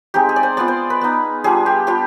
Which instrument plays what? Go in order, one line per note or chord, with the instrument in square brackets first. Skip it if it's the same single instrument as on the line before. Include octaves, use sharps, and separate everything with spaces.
[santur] G#3 C4 D#4 G4
G#4
D5
C5
B3 F4 D5
C5
B4
B3 D#4
G3 D4 F4 G#4
G4
B3 D4 F4 G4